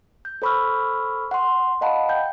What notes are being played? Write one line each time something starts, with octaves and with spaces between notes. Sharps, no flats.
G6
A4 C5 B5 C#6 E6 F6
F#5 C6
D#5 F5 F#5 A5 B5
G5 G6